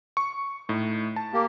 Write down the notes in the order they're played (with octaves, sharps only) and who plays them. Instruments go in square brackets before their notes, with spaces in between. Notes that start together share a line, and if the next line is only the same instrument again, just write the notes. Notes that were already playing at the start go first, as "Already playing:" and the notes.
[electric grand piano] C#6
A2 D#4
A5
[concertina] A#3 G4